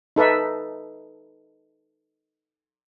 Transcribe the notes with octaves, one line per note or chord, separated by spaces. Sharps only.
D#4 A4 B4 E5